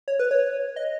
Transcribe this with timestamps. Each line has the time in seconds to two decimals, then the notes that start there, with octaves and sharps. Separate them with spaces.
0.08 C#5
0.19 B4
0.31 C#5
0.76 D#5